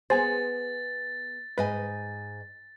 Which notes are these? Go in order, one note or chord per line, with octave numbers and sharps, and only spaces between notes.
B3 G#4 C5 G#5 A6
G#2 B4 D#5 G#5